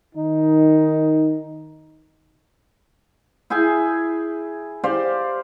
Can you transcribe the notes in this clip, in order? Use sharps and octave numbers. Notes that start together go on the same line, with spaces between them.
D#3 D#4
E4 G#4 G5 G#5
G4 C5 D5 F5